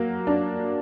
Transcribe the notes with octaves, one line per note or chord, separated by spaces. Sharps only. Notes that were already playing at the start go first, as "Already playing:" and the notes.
Already playing: F#3 A#3
D4